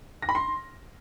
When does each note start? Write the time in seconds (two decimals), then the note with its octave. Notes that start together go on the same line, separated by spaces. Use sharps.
0.22 A#6
0.29 B5
0.35 C6